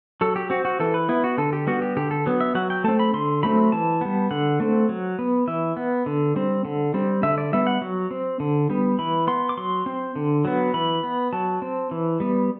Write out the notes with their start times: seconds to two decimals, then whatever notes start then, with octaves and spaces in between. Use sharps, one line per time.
0.21 F#3 A4
0.36 G4
0.50 C4 F#4
0.65 F#4
0.80 E3 A4
0.94 B4
1.09 B3 E4
1.24 F#4
1.38 D3 A4
1.53 G4
1.67 G3 B3 F#4
1.82 G4
1.97 D3 G4
2.11 A4
2.26 F#3 B3
2.40 E5
2.55 F#3 F#5
2.70 G5
2.84 A3 C4 A5
2.99 B5
3.14 D3 C6
3.43 F#3 A3 C4 B5
3.72 E3 A5
4.01 G3 B3
4.31 D3 F#5
4.60 A3 C4
4.89 F#3
5.19 B3
5.47 E3 E5
5.77 B3
6.06 D3
6.36 G3 C4
6.65 D3
6.94 G3 C4
7.23 D3 E5
7.38 D5
7.53 G3 B3 E5
7.67 F#5
7.82 F#3
8.11 C4
8.40 D3
8.70 G3 B3
8.99 E3 B5
9.27 B3 C6
9.49 D6
9.57 F#3 C6
9.86 C4
10.16 D3
10.45 F#3 B3
10.74 E3 B5
11.03 B3
11.33 F#3 A5
11.62 C4
11.91 E3
12.20 G3 B3